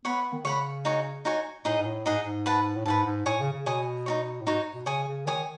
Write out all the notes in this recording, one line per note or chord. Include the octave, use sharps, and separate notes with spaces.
B3 C#5 F#5 B5
D#3
C#3 C#5 F#5 B5
D#4 F#4 C#5 G#5
D#4 F#4 C#5 G#5
A2 D#4 G#4 D#5 F#5
G#2
A2
G#2 D#4 G#4 D#5 F#5
G#2
B4 F#5 A5
A2
G#2 B4 F#5 A5
G#2
A2 C#5 G#5 D#6
C#3
C#3
B2 C#5 G#5 D#6
D#4 F#4 C#5
A2
G#2 D#4 F#4 C#5
B2
C#3 C#5 G#5 D#6
C#3
D#3 C#5 G#5 D#6